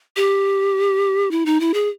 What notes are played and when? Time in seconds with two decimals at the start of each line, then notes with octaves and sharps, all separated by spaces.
0.16 G4
1.31 E4
1.46 D#4
1.60 E4
1.74 G#4